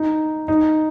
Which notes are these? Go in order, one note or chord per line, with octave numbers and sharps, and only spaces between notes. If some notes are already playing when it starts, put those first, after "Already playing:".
Already playing: D#4
D#4